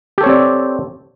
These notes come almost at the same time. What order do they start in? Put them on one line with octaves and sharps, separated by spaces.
G4 A4 C#5 C4 D5